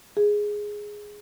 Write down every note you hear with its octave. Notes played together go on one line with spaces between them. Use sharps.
G#4